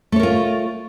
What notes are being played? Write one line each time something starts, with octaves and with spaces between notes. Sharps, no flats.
A3 F4 A#4 C#5